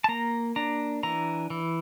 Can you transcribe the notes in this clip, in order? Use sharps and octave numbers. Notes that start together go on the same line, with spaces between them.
A5
A#3 A#5
D4 A#5
E3 A#5
E3